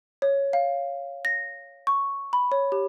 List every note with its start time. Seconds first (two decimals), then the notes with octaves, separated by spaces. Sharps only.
0.22 C#5
0.53 F5
1.25 A#6
1.87 C#6
2.33 B5
2.52 C#5
2.72 G4